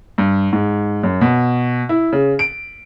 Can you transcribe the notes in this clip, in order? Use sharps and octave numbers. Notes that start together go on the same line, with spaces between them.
G2
G#2
F#2
B2
E4
C#3
D7